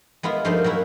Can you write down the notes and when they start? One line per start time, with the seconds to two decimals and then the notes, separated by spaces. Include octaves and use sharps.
0.23 G#3 B3 E4 F4
0.45 G2 F3 A3 A#3 D#4 C5
0.64 F#3 A#3 C#4 E4 F#4